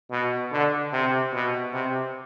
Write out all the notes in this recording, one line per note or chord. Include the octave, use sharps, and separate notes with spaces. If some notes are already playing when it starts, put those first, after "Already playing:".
B2
D3
C3
B2
C3